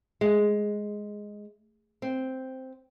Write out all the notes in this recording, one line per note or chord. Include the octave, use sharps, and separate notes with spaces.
G#3
C4